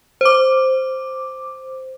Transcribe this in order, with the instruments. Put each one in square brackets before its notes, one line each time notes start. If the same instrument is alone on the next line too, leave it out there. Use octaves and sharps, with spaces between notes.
[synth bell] C5 D6